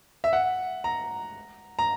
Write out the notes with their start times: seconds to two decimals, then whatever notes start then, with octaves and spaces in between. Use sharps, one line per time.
0.24 E5
0.33 F#5
0.84 A#5
1.79 A#5